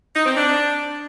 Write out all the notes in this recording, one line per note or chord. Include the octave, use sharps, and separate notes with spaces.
D#4
C4
D4